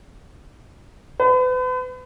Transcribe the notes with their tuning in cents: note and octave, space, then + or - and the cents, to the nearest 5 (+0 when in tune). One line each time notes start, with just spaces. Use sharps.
B4 +40